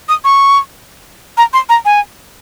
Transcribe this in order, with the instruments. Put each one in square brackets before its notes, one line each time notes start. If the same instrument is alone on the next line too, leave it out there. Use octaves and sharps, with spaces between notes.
[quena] D#6
C#6
A#5
C6
A#5
G#5